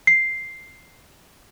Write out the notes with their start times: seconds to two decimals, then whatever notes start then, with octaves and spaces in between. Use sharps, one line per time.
0.07 C7